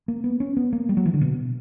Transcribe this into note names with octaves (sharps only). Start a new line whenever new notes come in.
A#3
B3
C#4
B3
A#3
G3
F#3
E3
D3
B2